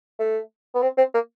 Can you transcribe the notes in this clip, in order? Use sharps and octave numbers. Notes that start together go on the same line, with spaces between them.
A3
B3
C4
C4
A#3